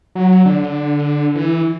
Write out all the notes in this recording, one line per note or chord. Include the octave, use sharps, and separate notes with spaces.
F#3
D3
E3